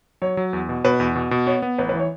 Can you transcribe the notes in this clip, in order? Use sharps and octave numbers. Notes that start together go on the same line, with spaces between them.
F#3 C#5
F#3
E2
B2
B2 B4
E2
B2
B2
B3 C#5
B3
A1 B4
B4
E3
C#5